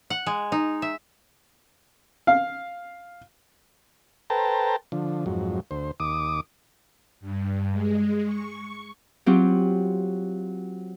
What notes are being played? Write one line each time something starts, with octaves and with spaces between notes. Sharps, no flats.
F#5
G#3
D#4
E5
F5
A4 B4 C5 G5 A5 A#5
D3 F3
F2 G#2 F#3
D2 C5
D#2 D6 D#6
G2
G#3
C#6
F#3 C4 F4 G4